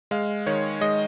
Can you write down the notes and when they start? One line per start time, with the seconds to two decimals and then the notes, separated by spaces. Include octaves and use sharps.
0.11 G#3 F5
0.46 D#3 C#5
0.81 G#3 D#5